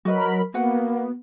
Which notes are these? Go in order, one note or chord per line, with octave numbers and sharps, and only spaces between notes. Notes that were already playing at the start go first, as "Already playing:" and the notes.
F#3 F#4 A#4 B4 D#5 B5
A#3 B3 F#4 B4 F#5